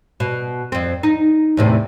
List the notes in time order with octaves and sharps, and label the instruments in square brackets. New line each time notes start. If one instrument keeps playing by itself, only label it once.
[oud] B2
F2 C4
D#4
E2 A2 C3